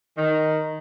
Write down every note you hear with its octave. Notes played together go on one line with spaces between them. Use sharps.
D#3